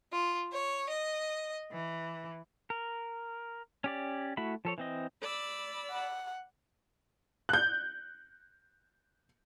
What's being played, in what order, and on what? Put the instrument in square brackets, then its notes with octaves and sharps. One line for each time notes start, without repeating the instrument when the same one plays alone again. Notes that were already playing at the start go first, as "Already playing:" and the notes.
[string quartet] F4
C#5
D#5
E3
[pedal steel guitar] A#4
C#4 G4 D5
A3 E4 F#4 B5
F3 A4 C#5
E3 C4 D#5
[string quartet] D5 B5 E6
[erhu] F#5
[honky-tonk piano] F#6 G6